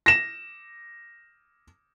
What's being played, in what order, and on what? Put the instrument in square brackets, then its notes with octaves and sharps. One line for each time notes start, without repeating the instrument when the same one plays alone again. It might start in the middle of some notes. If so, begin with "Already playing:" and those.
[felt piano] A#6 E7